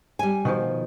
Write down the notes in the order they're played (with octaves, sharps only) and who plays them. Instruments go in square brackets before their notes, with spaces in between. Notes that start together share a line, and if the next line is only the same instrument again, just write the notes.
[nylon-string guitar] G3 G#5
[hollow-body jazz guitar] B2 D#3 F3